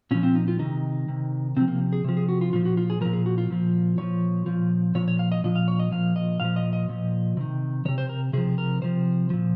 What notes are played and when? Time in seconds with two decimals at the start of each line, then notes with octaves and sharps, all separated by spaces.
0.11 A#2 F3 C#4
0.23 C4
0.35 D#4
0.48 F4
0.59 C3 D#3 D#4
1.08 C3 D#3
1.57 C3 F3 C4
1.68 A#3
1.93 G#4
2.04 C3 F3
2.17 G#4
2.29 F#4
2.41 F4
2.53 A#2 F3 F4
2.65 F#4
2.77 F4
2.90 G#4
3.01 A#2 F3 A#4
3.13 G#4
3.26 F#4
3.38 F4
3.50 A#2 F3
3.98 A#2 F3 C#5
4.46 A#2 F3
4.95 A#2 F3 C#5
5.08 C#5
5.19 F5
5.32 D#5
5.44 A#2 F3 D#5
5.56 F5
5.68 C#5
5.79 D#5
5.91 A#2 F3 F5
6.16 D#5
6.40 A#2 F3 F5
6.56 D#5
6.73 D#5
6.89 A#2 F3
7.37 C3 D#3
7.85 C3 D#3 C#5
7.98 C5
8.09 A#4
8.33 C3 F3 G#4
8.58 A#4
8.82 C3 F3 C5
9.30 A#2 F3